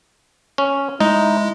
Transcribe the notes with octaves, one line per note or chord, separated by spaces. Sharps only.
C#4
G#3 D#4 E4